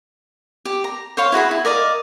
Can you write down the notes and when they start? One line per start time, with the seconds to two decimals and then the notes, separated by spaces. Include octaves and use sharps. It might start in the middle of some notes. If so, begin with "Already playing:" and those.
0.65 G4
0.84 A#5
1.17 C5 C#5 F5 C6
1.32 E4 F#4 G#4 B5
1.51 E4
1.65 A#4 D5 D#5 F5